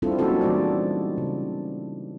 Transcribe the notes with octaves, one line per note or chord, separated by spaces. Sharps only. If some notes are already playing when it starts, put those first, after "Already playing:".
G3 C4 D4 E4 F4 A4
F#3 A#3 C#4 D#4 F#4 A4
E3 G3 G#3 A#3 D5
C#3